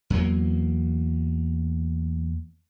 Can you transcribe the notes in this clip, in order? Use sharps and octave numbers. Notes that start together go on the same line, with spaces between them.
E2 F#3 A#3